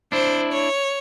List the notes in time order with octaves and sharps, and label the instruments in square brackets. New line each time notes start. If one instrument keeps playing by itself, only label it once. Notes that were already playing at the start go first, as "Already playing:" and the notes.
[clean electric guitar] D4 E4 [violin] C5
[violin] C#5